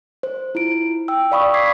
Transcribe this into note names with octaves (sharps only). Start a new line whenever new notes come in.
C5
E4 F4 D7
G5 E6
D5 F5 B5 C#6 D#6
D6 G#6 B6 C7